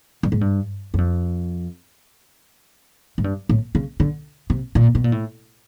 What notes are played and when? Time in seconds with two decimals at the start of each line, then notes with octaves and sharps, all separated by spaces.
0.23 G2
0.32 G#2
0.41 G2
0.94 F#2
0.98 F2
3.18 G#2
3.24 G2
3.49 A2
3.75 C#3
4.00 D3
4.50 C3
4.75 A#2
4.95 B2
5.04 A#2
5.12 A2